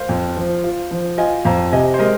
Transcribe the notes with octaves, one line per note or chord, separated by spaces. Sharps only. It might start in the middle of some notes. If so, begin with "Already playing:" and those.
Already playing: A#4 C5 F5
F2
F3
F4
F3
F4 D#5 G#5
F2 F5 A#5
C3 D#5 G#5
C5
G#3 A#4 D#5